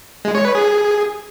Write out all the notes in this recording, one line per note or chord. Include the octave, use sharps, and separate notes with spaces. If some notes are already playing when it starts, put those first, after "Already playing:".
G#3
C#5
B4
G#4